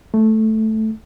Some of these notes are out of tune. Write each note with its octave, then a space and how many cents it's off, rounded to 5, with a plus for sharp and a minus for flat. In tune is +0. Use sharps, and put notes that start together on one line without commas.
A3 -5